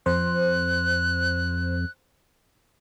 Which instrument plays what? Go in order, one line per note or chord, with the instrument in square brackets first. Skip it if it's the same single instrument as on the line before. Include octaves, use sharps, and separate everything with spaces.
[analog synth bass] F2 [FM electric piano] C5 [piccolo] F#6